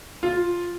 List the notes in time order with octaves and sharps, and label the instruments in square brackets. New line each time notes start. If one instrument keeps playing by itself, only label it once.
[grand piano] F4